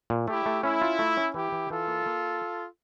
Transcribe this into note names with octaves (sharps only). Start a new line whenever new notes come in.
A#2
A3 E4 G4
A3
C#4 E4
F4
A3
C#4
E3 E4 G4
E3
E3 F4 A4
A#3
A#3